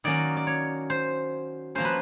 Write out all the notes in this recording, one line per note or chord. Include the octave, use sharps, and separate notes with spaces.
D#3 F#3 A#3 C#4 D5
D5
C#5
C5
F3 A#3 C#4 C5
B4